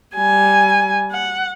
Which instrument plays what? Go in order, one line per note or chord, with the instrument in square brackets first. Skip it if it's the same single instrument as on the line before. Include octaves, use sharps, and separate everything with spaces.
[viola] G3 G#5
F#5